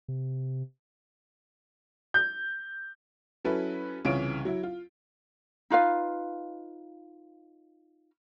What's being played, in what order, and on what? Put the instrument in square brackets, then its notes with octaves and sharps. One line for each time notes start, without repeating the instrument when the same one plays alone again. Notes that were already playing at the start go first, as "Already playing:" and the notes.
[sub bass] C3
[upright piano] G6
[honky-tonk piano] F#3 C#4 E4 A4 B4
C2 C#3 E3 F4 C#5 D7
F#3 E4
F4
[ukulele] D#4 F4 B4 F5